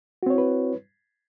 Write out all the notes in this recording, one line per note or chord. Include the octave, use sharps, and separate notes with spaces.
C4 E4 F#4 B4 C#5